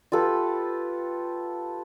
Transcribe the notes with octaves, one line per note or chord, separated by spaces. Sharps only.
F4 G4 A4 B4